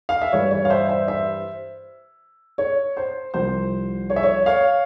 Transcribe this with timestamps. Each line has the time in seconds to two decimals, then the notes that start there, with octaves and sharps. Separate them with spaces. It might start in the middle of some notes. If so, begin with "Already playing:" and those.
0.09 F5
0.22 E5
0.32 G2 E3 C#5
0.51 C#5
0.65 F5
0.70 C5 E5
0.89 C5 E5
1.08 C5 E5
2.58 C#5
2.97 C5
3.34 C2 C3 F3 C5
4.10 C#5
4.16 E5
4.23 C#5
4.46 C#5 F5